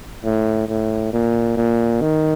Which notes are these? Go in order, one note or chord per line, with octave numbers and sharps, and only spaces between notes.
A2
A2
A#2
A#2
D#3